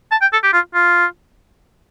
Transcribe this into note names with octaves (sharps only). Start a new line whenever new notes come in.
A5
G5
A4
G4
F4
F4